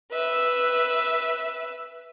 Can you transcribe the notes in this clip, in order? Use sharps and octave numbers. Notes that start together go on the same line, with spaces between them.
B4 E5